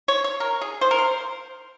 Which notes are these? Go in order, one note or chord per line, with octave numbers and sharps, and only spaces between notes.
C#5
C#5
A#4
G#4
C5
A#4
C5